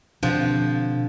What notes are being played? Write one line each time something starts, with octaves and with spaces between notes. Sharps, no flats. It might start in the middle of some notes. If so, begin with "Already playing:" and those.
B2 D3 F3 C4 D4 G4